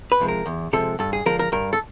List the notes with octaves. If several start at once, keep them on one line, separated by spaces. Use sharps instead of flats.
B4
C3 F3 G#3
A#4
E2
C3 F3 G#3 A4
G2 A4
G#4
D3 F3 G#3 A#4
A#4
G2 A#4
A4